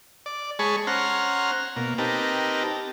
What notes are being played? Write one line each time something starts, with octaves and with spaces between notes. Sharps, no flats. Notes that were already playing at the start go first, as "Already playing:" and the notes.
D5
G#3 G#4 C#5 A5 B5 C#6
C#4 C5 F#5 A#5 C6 F6
B2 A#3
C4 D#4 G4 A#4 B4 A5